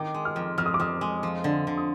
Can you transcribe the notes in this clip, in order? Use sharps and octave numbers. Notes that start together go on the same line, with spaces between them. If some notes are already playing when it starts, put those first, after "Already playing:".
Already playing: D#3 C4 D6
G#3
F6
F2
F2 F6
D#6
D6
F2 D#6
G#3
F3
D3
D3
D#6